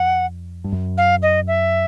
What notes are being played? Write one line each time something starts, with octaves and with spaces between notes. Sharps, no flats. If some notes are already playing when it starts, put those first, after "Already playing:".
Already playing: F2 F#5
G2
F#2
F5
D#5
E5